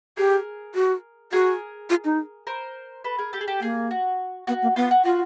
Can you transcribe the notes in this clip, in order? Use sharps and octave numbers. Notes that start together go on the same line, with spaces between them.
G4 G#4 A#4
F#4
F#4 G#4 A#4
F4
D#4
A#4 C5
A4 B4
G#4 A#4
G4 A4
G#4
G4 A4
A#3 G#4
F#4
B3 F#4
A#3
B3 F4
F#4
F4 F#4